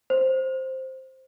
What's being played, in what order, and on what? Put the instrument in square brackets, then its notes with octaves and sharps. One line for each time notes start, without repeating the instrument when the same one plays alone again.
[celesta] C5